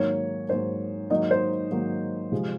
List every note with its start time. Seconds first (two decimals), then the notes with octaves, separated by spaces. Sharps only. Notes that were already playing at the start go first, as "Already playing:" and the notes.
Already playing: G#2 D#3 F#3 A#3 C#5
0.49 G#2 D#3 F#3 A#3 C5
1.10 G#2 D#3 F#3 A#3 D#4 D#5
1.31 C5
1.71 G#2 D#3 F#3 A#3
2.32 C3 F3 G#3